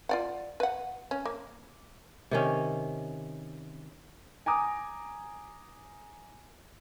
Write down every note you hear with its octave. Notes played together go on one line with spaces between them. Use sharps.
F4 D5 F#5
B4 F#5
C#4
A#3
C3 D#3 C#4
G#5 A#5 D6 D#6